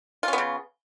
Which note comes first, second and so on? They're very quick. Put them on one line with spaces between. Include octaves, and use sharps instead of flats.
F4 C#4 B3 C#3